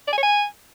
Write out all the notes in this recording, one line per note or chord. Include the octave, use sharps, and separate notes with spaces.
D5
G#5
C#5
G#5